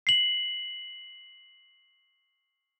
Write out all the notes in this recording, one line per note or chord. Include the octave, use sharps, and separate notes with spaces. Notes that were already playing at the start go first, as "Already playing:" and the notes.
C7 F#7